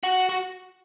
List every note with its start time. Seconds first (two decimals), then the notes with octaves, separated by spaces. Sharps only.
0.04 F#4
0.29 F#4